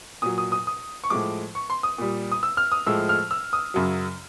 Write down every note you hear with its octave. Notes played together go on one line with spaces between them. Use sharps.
A#2 F#3 D#6
D#6
D#6
D#6
C#6
A2 F3 G#3 D6
C#6
C6
D#6
A#2 G3
D#6
E6
F6
D#6
A2 F3 G#3 E6
F6
E6
D#6
F#2 C#3 F#3